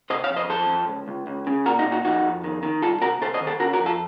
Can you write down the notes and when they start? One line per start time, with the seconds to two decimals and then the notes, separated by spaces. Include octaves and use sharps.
0.10 C3 C5 D#5
0.24 C#5 F5
0.30 F2
0.36 C5 D#5
0.49 F2 A4 C5
0.69 F2
0.88 C#2
1.08 C#2
1.27 C#2
1.47 C#3
1.66 A#2 F#4 A#4
1.79 D#4 F#4
1.85 A#2
1.92 D#4 F#4
2.05 F2 D#4 F#4
2.24 F2
2.44 D#3
2.63 D#3
2.82 C2 F4 A4
3.01 C3 F#4 A#4
3.21 C3 A4 C5
3.34 C5 D#5
3.41 D#3
3.47 A4 C5
3.60 C#3 F#4 A#4
3.73 F#4 A#4
3.80 F2
3.86 F4 A4